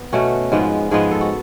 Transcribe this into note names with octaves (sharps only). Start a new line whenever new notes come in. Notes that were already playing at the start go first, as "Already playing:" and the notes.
Already playing: B3
B2 A3 C#4 F#4
G#2 F3 G#3 B3
G#2 F3 G#3 B3 G#4
A4
F#4